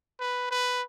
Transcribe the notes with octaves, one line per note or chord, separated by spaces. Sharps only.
B4
B4